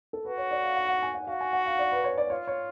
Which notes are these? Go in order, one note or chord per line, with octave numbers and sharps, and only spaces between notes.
A4
F#4 B4
C#5
D5
F5
F#5
F#5
G#5
F#5
F#4 F5
G#5
F#5
F5
D5
B4
C#5
D5
F4 C#5
C#5